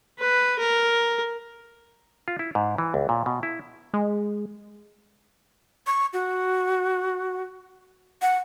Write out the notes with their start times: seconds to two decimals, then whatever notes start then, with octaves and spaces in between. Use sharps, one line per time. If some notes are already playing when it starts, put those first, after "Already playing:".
0.19 B4
0.59 A#4
2.28 F4
2.39 E4
2.55 G#2
2.78 E3
2.94 C#2
3.09 A#2
3.26 B2
3.43 E4
3.94 G#3
5.87 C#6
6.13 F#4
8.22 F#5